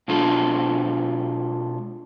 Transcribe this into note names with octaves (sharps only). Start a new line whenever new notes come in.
B2 G#3 D4 F4 A4